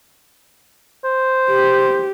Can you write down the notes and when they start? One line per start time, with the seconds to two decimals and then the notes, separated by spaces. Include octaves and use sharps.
1.04 C5
1.50 G4